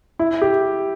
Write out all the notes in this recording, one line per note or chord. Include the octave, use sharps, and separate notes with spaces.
E4
G4